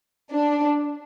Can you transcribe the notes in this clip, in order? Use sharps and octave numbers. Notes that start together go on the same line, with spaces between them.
D4